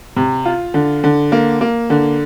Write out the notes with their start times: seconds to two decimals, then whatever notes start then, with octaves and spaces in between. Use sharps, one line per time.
0.16 C3
0.45 F4
0.74 D3
1.04 D3
1.32 A#3
1.61 A#3
1.90 D3